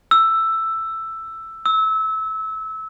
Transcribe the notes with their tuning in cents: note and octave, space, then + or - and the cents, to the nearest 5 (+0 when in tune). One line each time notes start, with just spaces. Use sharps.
E6 +5
E6 -25